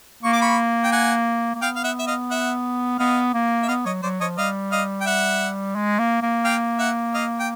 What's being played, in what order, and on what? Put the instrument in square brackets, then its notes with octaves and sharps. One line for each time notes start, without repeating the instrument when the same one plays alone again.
[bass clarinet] A#3 [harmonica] C#6
[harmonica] D6
B5 C#6
G5
F#5 G#5
[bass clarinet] A#3
[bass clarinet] B3 [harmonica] F5 G5
[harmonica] F5
E5 F#5
E5
D#5 F5
E5 F#5
[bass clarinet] B3 [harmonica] D#5 F5
[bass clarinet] A#3
[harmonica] E5
[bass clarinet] B3 [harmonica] D#5 F5
[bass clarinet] F#3 [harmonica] C#5 D#5
[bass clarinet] F#3 [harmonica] C5 D5
[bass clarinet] F3 [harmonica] C#5 D#5
[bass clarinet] G3 [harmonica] D#5 F5
[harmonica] D#5 F5
G5
E5 F#5
[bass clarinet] G#3
A#3
A#3
[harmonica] F5 G5
E5 F#5
D#5 F5
G5